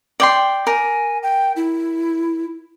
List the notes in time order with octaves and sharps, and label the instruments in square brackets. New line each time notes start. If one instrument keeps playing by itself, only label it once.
[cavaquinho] D5 G5 C6
[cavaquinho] A#4 [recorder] G#5
[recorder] G5
E4